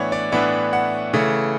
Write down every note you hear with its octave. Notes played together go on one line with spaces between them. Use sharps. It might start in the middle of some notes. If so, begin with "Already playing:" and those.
Already playing: A2 E3 B3 D4 C#5 F#5
D5
A2 E3 B3 D4 E5
F#5
C#3 E3 A3